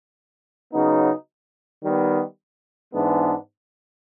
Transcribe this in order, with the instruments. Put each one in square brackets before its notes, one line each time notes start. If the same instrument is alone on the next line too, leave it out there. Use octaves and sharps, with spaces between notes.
[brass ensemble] C#3 F#3 B3 D#4
D#3 G3 B3
G#2 E3 G#3 B3 D4